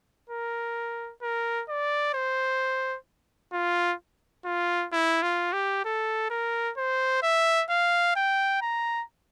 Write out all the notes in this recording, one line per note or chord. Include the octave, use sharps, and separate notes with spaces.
A#4
A#4
D5
C5
F4
F4
E4
F4
G4
A4
A#4
C5
E5
F5
G5
A#5